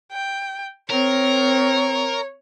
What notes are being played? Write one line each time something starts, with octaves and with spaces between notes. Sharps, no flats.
G5
C4 A#4 C#5